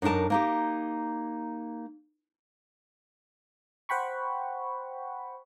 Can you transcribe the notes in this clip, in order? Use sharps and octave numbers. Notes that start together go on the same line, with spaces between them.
F#2 D4 D#4 A#4 A5
A#3 D#4 G4
C5 F#5 G5 B5 C#6